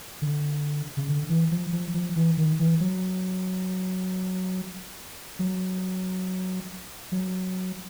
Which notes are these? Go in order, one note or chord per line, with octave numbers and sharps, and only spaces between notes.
D3
C#3
D3
E3
F3
F3
F3
E3
D#3
E3
F#3
F#3
F#3